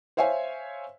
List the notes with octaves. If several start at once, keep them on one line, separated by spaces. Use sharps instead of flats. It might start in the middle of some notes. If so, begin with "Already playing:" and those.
C5 C#5 E5 F5 G#5